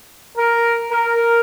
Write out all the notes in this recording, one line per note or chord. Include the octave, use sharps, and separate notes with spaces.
A#4
A#4